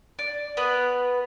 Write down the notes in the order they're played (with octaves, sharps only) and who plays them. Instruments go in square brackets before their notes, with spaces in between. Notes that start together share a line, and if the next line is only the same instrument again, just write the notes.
[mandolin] D5
B3 B4 F#6